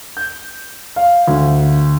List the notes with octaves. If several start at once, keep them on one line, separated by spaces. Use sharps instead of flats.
G6
F5
D2